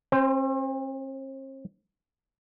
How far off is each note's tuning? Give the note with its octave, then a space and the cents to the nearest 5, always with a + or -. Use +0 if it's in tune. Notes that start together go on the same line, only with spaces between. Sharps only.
C4 +45 C5 -5